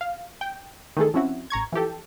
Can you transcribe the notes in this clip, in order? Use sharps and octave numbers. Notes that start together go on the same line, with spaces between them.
F5
G5
D#3 E3 A3 G#4 A4
F3 C4 C#4 E4 F#4
A1 A#5 C#6 G#6
E3 F3 G4 A4